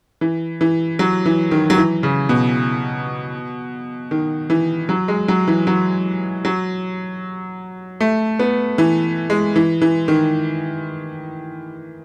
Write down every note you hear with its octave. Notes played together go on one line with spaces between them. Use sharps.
E3
E3
F#3
E3
D#3
F#3
E3
C#3
B2
D#3
E3
F#3
G#3
F#3
E3
F#3
F#3
A3
B3
E3
G#3
E3
E3
D#3